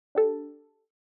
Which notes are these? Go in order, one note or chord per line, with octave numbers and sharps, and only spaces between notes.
D4 G4 A4